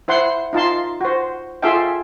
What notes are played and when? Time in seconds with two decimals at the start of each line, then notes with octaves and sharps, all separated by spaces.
0.08 E4 C5 F#5 C6
0.53 D#4 F4 A5 C6
1.01 F#4 C5
1.62 F4 G#4 A4 E5 F5 G5